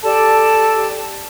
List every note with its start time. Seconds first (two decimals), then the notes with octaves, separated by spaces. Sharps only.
0.03 G4 A4 D5 A5